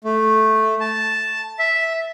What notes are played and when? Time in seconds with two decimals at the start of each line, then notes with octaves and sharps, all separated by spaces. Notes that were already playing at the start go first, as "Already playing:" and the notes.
0.05 A3
0.80 A5
1.59 E5